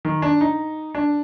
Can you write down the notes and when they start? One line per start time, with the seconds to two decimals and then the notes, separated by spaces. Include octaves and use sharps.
0.05 D#3
0.22 D4
0.41 D#4
0.95 D4